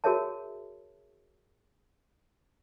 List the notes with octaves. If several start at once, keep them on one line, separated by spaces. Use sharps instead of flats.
F#4 G#4 A#4 C#5 E5 A5